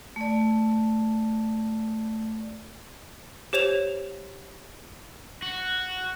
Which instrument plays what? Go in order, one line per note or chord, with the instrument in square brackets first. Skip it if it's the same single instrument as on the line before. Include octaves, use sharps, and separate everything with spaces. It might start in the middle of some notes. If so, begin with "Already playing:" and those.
[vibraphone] A3 D5
[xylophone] G4 C5 C#5 E7 F7
[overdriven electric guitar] F#4